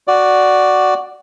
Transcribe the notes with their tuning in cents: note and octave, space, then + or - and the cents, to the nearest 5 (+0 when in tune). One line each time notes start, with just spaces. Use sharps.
F#4 +0 D5 +0